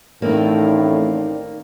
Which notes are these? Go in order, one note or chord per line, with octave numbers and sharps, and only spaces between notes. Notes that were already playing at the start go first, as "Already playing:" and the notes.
A1 A2 D#3 A#3 C4 D#4 D5